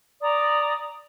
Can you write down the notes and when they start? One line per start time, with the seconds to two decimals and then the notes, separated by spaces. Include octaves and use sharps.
0.21 D5 A#5 D#6